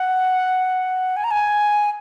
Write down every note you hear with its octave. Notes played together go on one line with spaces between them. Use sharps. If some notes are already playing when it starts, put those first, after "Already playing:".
Already playing: F#5
G#5
A#5
G#5